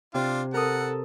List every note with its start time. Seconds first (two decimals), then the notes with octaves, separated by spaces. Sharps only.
0.14 C3 D4 F4
0.54 A4 A#4 F#5 D#6